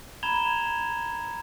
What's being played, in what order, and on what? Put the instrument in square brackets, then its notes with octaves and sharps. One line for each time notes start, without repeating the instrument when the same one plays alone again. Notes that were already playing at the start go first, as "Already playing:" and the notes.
[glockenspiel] A#5 B5 G#6 E7 F7 G7